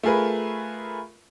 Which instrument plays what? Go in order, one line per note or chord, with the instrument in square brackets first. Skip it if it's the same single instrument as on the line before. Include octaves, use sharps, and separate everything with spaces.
[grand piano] A3 F4 G#4 A#4 B4